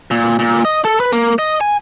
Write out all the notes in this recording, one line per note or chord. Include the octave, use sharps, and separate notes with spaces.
A#2
A#2
D#5
A4
B4
A#3
D#5
G#5